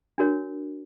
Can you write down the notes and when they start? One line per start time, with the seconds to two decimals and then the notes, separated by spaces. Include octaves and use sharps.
0.18 D4 F#4 A#4 C#5